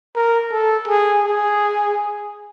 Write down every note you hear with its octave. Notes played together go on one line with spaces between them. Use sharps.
A#4
A4
G#4
G#4